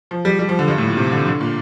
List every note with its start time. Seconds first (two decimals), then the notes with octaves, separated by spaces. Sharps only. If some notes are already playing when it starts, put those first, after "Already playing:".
0.11 F3
0.25 G3
0.39 G3
0.49 F3
0.59 D3
0.68 G2
0.78 A2
0.87 A#2
0.97 C3
1.12 D3
1.26 D3
1.41 A#2